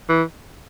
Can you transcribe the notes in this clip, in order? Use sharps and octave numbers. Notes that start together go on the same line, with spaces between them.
E3